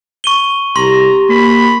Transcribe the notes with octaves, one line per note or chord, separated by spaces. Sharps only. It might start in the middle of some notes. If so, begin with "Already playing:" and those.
C#6 D#7 G7
C2 G4 A#5 C6
A#3 B5